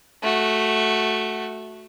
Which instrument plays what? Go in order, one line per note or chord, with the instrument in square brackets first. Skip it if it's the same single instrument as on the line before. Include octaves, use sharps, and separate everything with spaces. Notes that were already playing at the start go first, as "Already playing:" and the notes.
[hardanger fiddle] A3 F#4